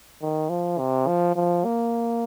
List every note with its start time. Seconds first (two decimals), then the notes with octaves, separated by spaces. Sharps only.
0.22 D#3
0.50 F3
0.79 C3
1.07 F3
1.36 F3
1.65 A#3